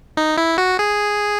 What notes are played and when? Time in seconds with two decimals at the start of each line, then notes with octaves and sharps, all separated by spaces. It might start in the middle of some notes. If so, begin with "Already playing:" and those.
0.17 D#4
0.38 E4
0.58 F#4
0.79 G#4